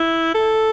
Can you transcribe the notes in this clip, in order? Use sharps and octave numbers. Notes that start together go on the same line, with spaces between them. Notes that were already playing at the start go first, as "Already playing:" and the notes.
Already playing: E4
A4